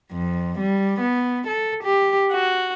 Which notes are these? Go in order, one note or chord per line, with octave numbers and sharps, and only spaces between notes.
F2
G3
B3
A4
G4
F#4